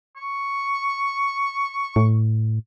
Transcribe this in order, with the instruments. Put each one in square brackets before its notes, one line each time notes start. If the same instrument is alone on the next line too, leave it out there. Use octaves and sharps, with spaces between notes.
[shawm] C#6
[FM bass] A2